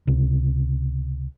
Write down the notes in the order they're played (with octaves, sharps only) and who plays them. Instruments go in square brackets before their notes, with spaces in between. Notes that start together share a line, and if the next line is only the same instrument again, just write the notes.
[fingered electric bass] C#2 C3